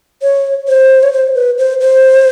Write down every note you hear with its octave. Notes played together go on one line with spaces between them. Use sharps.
C#5
C5
C#5
C5
B4
C5
C5